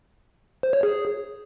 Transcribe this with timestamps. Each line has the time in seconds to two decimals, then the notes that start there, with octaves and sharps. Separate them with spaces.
0.63 C5
0.73 C#5
0.83 G#4